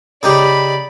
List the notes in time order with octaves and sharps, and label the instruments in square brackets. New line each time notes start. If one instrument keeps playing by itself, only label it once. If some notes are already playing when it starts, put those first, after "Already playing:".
[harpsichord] C#3 D#4 G4 [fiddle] D5 B5